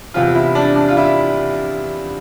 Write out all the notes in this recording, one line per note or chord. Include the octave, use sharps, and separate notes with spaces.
E2 C3 F3 F4
E4
D4
D4
F4
E4